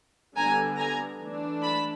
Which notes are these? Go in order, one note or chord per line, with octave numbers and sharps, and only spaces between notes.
D3 G3 B3 D4 G#5 A#5
G#5 A#5
E3 A3 D4
A5 B5